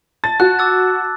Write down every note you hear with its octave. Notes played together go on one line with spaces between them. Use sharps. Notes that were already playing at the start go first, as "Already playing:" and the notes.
A5 A6
F#4 F#6
D6 E6 A6